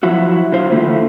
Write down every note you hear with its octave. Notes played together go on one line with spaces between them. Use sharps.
F3 F#3 E4 F#4
D3 F#3 C5 F5
E2 D3 A3 A#3 E4 F4